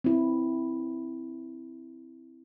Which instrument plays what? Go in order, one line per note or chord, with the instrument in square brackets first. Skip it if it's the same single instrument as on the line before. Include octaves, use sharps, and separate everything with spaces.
[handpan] C4 E4